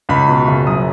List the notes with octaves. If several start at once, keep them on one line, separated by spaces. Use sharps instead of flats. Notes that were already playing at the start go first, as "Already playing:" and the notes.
C#2 B5
B2
F#1
F#2 D#6